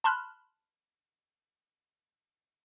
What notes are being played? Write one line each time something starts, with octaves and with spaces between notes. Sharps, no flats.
A5 B5 C6 F6 F#6